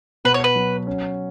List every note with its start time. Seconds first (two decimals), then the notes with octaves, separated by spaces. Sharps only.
0.25 B2 B4
0.34 C#5
0.44 B4
0.56 F#3
0.87 C#4